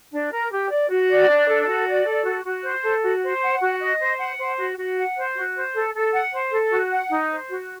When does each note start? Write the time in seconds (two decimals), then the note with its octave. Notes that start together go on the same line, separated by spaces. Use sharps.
0.12 D4
0.31 A#4
0.51 G4
0.70 D5
0.89 F#4
1.09 D5
1.28 D4
1.48 A4
1.67 F#4
1.87 D5
2.06 A4
2.25 F#4
2.44 F#4
2.63 C5
2.83 A4
3.03 F#4
3.22 C5
3.42 F#5
3.60 F#4
3.80 D#5
3.99 C5
4.19 F#5
4.38 C5
4.58 F#4
4.77 F#4
4.97 F#5
5.17 C5
5.35 F#4
5.56 C5
5.75 A4
5.95 A4
6.13 F#5
6.33 C5
6.52 A4
6.71 F#4
6.91 F#5
7.10 D#4
7.30 C5
7.49 F#4